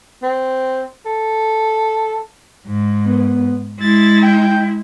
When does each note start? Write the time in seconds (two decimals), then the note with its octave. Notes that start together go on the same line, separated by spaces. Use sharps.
0.23 C4
1.06 A4
2.66 G#2
3.05 B3
3.80 G#3 E4 A6
4.23 G5